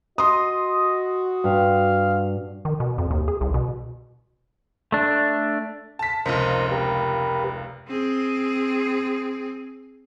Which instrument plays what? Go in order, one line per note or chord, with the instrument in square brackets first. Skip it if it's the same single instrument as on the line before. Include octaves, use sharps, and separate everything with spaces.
[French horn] F#4 [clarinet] D#5 [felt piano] C6 D#6
[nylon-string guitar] G2 [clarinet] F5
[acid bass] D#3
B2
F2
D#2
G#4
C2
B2
[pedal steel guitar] A3 D4
[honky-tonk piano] A5 B6
[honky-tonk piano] F1 C#2 [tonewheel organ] A#4 C5 D#5
[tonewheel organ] G4 A#4 B4
[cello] C4 G#4